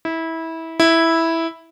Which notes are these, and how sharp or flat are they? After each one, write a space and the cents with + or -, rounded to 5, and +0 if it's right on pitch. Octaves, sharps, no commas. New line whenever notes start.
E4 -20
E4 -5